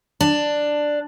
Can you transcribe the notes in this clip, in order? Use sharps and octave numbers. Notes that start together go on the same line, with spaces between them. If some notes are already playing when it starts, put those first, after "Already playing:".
D4